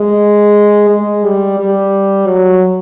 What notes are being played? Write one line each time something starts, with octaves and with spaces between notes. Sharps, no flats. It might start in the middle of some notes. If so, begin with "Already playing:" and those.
Already playing: G#3
G#3
G3
G3
F#3